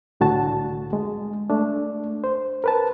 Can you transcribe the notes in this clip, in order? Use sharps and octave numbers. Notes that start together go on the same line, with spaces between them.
C2 A2 D3 F#4 A5
G#3
A3 D4
C5
A#4 B4 A5